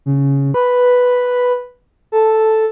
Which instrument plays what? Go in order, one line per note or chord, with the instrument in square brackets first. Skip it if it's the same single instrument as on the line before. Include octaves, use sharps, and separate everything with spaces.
[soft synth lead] C#3
B4
A4